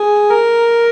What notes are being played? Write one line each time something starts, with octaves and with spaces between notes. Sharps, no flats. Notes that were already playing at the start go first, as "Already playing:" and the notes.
Already playing: G#4
A#4